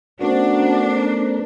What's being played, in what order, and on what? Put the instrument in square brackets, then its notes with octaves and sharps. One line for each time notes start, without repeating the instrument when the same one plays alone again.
[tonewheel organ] A3 B3 A#4 [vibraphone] C#4 C5 [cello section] D4 [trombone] F#4